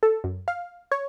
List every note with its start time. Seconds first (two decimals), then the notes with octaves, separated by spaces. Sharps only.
0.03 A4
0.24 F#2
0.48 F5
0.91 C#5